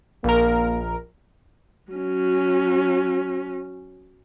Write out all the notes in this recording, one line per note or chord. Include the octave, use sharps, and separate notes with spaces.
A#1 A#3 A#4
F#3 C#4